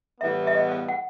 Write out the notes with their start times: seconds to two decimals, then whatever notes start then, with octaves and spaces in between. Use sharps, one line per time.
0.21 A2 E3 G3 B3 E5
0.47 E5
0.55 D#5
0.72 F5
0.88 F#5